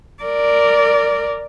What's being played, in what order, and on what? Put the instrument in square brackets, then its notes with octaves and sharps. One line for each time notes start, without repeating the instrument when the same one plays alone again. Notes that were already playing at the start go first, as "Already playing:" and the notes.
[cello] A#4 D5